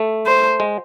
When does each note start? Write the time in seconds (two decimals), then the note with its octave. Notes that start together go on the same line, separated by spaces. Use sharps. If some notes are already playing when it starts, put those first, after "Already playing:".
Already playing: A3
0.26 C5
0.60 G#3